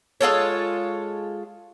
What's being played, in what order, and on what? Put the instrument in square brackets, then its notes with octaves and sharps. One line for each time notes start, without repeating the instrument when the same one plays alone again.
[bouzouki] G#3 F4 A4 C#5